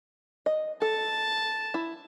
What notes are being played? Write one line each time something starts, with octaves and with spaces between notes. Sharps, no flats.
D#5
A4 A5
E4